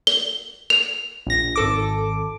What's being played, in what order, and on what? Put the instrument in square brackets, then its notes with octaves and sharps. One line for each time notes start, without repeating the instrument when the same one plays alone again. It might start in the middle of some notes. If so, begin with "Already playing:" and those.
[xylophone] G7
F7
[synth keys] A#1 A#6
G#1 A4 D6